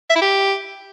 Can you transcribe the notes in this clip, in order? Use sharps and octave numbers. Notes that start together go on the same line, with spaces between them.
E5
E4
G4